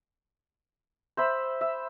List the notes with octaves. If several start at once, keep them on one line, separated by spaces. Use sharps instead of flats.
C5 E5 B5
E5